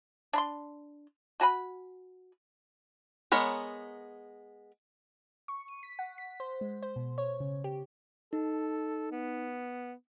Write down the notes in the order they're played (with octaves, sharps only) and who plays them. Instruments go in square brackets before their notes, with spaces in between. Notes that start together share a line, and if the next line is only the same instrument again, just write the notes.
[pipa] D4 B5 C6
A3 F#4 G#5 B5
[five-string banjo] G#3 B3 A#4 C#5
[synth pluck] C#6
D#7
B6
F#5
B6
C5
G#3
C5
B2
C#5
C#3
G4
[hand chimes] D#4 [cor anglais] A4
[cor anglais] B3